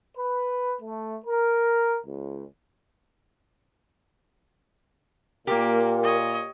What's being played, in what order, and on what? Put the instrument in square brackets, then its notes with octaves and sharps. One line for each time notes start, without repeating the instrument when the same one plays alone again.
[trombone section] B4
A3
A#4
C#2
[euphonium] A#2 [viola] A#3 [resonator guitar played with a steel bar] G4 [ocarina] A#4
[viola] C#5 D#5